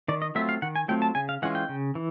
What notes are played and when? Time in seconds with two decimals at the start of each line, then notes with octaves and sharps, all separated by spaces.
0.08 D#3 D5
0.22 D#5
0.35 F#3 A3 C4 F4 E5
0.49 F5
0.62 D#3 F#5
0.76 G#5
0.88 F#3 A3 C4 F4 G5
1.02 A5
1.15 C#3 G#5
1.29 F5
1.42 E3 G#3 C#4 F4 F#5
1.55 G5
1.69 C#3
1.95 E3